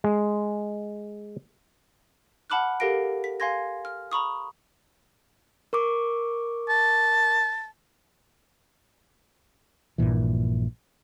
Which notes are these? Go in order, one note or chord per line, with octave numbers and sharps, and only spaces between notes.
G#3
F#5 A5 B5 D6 F6 F#6
G4 A4 A#4 F5 A#6 D7
B6
F5 G#5 C6 G#6 A#6
F6
A#5 B5 C#6 D#6
A#4 C#6 D6
A5
A#1 G2 A#2 E3